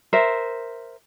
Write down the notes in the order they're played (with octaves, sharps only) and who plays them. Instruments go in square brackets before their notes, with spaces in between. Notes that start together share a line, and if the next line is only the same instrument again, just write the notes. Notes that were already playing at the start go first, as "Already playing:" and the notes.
[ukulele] A#4 C5 E5